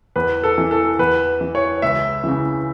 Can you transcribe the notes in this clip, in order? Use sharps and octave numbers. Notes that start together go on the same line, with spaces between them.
E2 B4
A4
E3
A4
E2 B4
E3
C#5
C#2 E5
C#3 E3